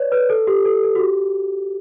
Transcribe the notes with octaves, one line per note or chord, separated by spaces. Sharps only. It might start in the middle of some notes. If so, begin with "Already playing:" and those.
Already playing: B4 C#5 D5
B4
A4
G4
A4
A4
F#4
G4